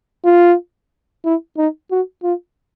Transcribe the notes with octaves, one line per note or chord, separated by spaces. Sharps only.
F4
E4
D#4
F#4
F4